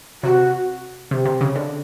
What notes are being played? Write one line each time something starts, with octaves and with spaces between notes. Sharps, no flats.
C3 F#4
C3 G4
C3
C#3
D3